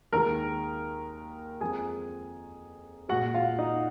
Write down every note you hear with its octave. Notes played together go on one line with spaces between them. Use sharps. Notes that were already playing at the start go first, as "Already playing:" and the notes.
D#2 D#3 G#3 A#4 A#5
F2 F3 G#3 G#4 G#5
A#2 G#3 F#4 F#5
F4 F5
D#4 D#5